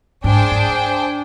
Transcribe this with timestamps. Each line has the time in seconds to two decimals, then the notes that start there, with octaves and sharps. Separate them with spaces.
0.24 G#2 D4 G#4 C5 G5
0.51 G#2